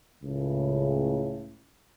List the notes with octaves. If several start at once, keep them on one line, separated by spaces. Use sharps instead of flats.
C#2 A2 C#3